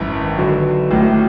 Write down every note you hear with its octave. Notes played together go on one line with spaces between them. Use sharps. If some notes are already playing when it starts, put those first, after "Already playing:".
Already playing: G#1 F#2 E3
D3 F#3 B3
A1 A2 F#3